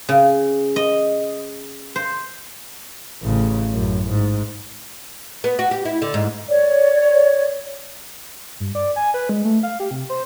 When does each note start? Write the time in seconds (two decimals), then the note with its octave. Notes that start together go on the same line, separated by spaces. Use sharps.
0.09 C#3
0.76 D#5
1.96 C5
3.22 A1 C#3
3.72 A1 F#2
4.10 G#2
5.44 B3
5.59 F#4
5.71 G4
5.85 E4
6.02 D3
6.14 G#2
6.49 C#5 D5
8.60 G2
8.75 D5
8.96 G#5
9.14 B4
9.29 G#3
9.45 A3
9.63 F5
9.80 G4
9.91 C3
10.09 C5